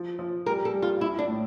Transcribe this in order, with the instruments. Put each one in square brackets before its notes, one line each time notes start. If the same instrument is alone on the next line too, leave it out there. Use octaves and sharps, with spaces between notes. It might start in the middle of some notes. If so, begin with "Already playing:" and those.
Already playing: [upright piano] F3
F3
[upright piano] G3 [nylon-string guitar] A#4
[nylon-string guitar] A4
[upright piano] G3
[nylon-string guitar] F4
[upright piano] A#1 [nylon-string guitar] E4
[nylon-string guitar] D4
[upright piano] A2